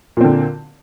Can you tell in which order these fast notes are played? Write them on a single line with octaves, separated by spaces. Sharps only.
A#2 C4 D3